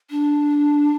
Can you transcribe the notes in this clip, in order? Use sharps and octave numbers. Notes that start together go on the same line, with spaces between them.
D4